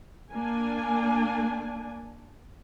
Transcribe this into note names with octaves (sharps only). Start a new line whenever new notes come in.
A#3 D4 G#5